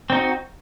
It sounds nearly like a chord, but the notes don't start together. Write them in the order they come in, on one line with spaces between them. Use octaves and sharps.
C4 D#4 F#4